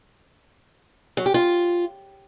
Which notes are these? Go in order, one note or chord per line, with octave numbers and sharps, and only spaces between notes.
F#3
G4
F4